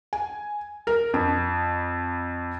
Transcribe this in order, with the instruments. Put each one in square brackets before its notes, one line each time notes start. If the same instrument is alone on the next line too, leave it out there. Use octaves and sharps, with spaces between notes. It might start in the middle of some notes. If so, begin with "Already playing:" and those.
[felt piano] G#5
A#4
F2